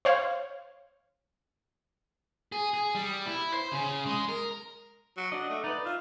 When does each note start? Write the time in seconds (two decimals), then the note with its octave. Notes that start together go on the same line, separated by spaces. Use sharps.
0.05 C5 C#5 F5
2.52 G#4
2.74 G#4
2.95 G3
3.26 E4
3.53 C5
3.72 C#3
4.06 G#3
4.29 A#4
5.17 F#3
5.32 D4 D#5 F#5
5.50 A3
5.64 D#4 B4 D5
5.85 F4 E5